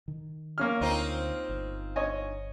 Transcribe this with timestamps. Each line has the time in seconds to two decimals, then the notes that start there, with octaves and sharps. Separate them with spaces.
0.08 D#3
0.58 A#3 C#4 F6
0.81 D2 C4 D#4 F4
1.49 G1
1.96 C#5 D#5 G#5